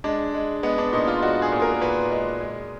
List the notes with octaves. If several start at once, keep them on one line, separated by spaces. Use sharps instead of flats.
G#3 D4
G#3
G#3 B3
D4
A#2 D#4
F4
G#3 F#4
G#4
A#2
A#4
A#2 B4
G#3
G#3